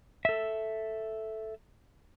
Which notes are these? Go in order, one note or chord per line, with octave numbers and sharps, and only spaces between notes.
A4 E5